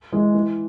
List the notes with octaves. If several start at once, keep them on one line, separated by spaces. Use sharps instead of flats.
E3 G#3
E3